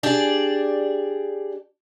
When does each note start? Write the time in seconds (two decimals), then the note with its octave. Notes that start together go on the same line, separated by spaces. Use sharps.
0.03 D4 G4 G#4 D5